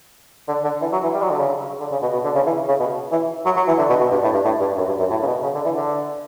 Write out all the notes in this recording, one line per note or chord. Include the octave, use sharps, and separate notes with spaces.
D3
D3
E3
F#3
E3
G3
F#3
D3
C#3
D3
C#3
B2
B2
D3
C#3
E3
C#3
B2
E3
F#3
F#3
E3
D3
B2
B2
G2
A2
G2
A2
G2
F#2
G2
F#2
A2
C#3
B2
C#3
D3
E3
D3